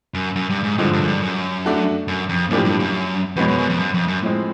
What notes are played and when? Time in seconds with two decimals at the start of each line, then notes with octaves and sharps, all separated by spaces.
0.14 F#2
0.36 F#2
0.50 G2
0.64 G#2
0.78 G2 D3 F3 G#3
0.93 G2
1.00 F#2
1.08 G2
1.22 F#2
1.65 A3 D4 F#4 A4
2.08 F#2
2.29 F2
2.50 F#2 A2 F3 A#3 D4 G4
2.65 G2
2.80 F#2
3.36 F2 B2 G#3 C#4 F#4 B4
3.48 F#2
3.58 F#2
3.69 F2
3.79 F#2
3.94 F2
4.08 F#2
4.22 A2 F3 G#3 C4